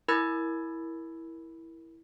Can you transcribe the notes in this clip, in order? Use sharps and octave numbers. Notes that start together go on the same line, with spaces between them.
E4 A#4 B5 E6 G#6 A6